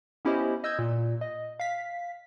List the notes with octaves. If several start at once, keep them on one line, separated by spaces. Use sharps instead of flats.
B3 C#4 E4 G4 C5 D#5
D#5 E6 G6 G#6
A#2
D#5
F5 B6